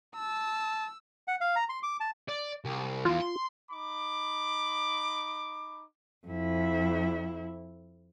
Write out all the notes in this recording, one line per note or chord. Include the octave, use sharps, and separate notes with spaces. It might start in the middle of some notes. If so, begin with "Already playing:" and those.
A5 E6
F#5
F5
A#5
C6
D6
A5
D5
C2
E2 E3 F4
C6
D#4 B5 D6
F2 E4